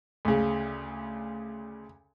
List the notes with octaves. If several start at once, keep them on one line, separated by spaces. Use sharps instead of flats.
D2 C#3